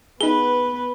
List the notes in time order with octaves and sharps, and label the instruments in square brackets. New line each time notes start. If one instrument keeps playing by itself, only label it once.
[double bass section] B3 [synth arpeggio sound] D#4 G#4 [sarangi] B4 [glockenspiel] G7